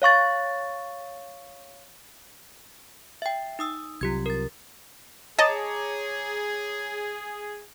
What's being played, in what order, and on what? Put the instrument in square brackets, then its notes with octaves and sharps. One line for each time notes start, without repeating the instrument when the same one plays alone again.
[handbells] C#5 F5 C#6 A6
E5 G5
D#4 D#6 E6
[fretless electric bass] C2 F#3 [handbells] F4 G4 G#6
[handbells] A#4 A6
[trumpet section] G#4 [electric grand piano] C#5 A#5 D6 [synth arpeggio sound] D#5 [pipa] A5